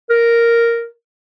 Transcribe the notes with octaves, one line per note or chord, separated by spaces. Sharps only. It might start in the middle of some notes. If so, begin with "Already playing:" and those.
A#4